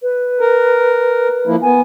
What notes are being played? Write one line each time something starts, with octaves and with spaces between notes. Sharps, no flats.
B4
A#4
F3 A#3 E4
B3 G#5